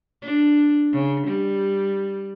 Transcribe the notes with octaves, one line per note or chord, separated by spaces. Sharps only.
D4
C#3
G3